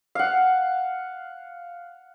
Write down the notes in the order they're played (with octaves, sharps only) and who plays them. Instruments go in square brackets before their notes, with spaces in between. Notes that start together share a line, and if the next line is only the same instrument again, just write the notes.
[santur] F5 F#5